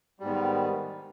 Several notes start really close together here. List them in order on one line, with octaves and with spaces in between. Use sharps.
G3 G#2 B3 D#3